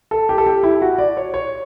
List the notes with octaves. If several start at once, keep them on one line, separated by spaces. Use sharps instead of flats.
A4
G4
A4
G4
E4
F#4
D5
C#5
C#5